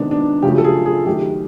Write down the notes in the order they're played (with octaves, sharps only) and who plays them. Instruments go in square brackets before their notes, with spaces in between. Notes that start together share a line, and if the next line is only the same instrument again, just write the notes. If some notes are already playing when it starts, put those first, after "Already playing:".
Already playing: [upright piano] C3 D#3 G#3 B3 D4
D4
F#2 C#3 F3 A3 G4
A4
G#4
G#4
F#2 D#3 F#3 A3 G4